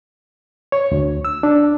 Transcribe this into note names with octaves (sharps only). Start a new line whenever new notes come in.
C#5
D2
E6
D4